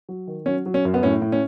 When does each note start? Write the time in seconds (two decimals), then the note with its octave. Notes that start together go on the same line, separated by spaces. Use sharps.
0.09 F#3
0.27 D#3
0.46 F#3 C#4
0.66 F#3
0.74 C#4
0.85 F#2
0.94 B3
1.03 A2 C#4
1.22 A2
1.32 C#4